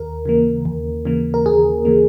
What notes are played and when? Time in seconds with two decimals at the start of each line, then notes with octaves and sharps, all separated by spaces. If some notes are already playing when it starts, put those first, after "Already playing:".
Already playing: D#2 A#4
0.25 C#3 E3 A#3
0.65 D#2
1.05 C#3 E3 A#3
1.34 A#4
1.46 D#2 G#4
1.85 C#3 E3 A#3